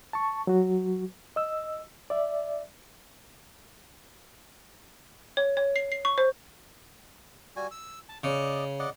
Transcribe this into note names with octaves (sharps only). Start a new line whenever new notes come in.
A5 C#6
F#3 F#4
D#5 E6
D5 E5
C#5
C#5
C7
C7
C#6
C5
G3 F#4 G#5
E6
A5
C#3 D5 D#5
D5 D#5 F#5